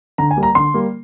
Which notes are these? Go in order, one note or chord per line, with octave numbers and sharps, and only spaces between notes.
D3 A#5
G#5
G3 A#3
A#5
D3 C6
G3 A#3